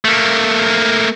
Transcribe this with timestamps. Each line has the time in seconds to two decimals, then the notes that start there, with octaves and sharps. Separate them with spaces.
0.05 A3 A#3